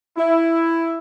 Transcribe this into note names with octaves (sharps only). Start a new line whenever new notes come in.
E4